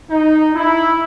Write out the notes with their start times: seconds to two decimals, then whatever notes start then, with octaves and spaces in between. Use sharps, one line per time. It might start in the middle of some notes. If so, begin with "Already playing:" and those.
0.10 D#4
0.55 E4